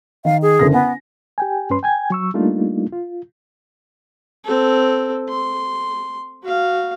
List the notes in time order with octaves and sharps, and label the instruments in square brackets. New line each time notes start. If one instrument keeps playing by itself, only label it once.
[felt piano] D#3 [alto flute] F5
[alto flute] G#4
[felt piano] F#1 D3 A#6
[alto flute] B3 [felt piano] G#5
[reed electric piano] G4 G5 G#5
G2 C#4 B4 C6
G5 G#5 G#6
F#3 C#6 E6
G3 A3 A#3 D4 D#4 F4
F4
[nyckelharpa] C4 A4
C6
F#4 F5